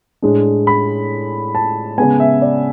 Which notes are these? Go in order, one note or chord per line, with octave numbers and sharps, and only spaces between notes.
A2 G#3 D4
B5
A5
C#3 G#3 B3 G#5
E5
D5